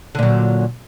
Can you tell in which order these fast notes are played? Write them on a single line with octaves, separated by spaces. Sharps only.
D3 A#2 F#3